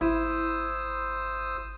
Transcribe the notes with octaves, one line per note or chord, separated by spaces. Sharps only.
G#1 E4 C5 D#6 E6